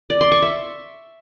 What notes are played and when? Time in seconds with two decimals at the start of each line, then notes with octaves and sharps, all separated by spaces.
0.10 D5
0.21 C6
0.32 C#6
0.42 E5